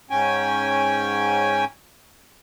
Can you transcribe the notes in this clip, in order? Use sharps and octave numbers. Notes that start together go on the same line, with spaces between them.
G#2 C#4 G5 G#5